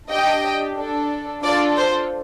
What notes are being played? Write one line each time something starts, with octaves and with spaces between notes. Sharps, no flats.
D4 G4 D#5 G5
D4 A4
D4 F4 A4 D5
C5